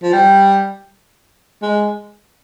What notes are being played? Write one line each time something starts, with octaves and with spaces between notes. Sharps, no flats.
F3
G3
G#3